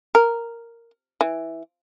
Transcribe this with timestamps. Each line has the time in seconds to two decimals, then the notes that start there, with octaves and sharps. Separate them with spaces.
0.15 A#4
1.21 E3